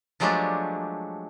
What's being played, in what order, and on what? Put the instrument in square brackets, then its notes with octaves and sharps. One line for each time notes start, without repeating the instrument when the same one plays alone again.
[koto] F3 F#3 G#3 A3 D4 G4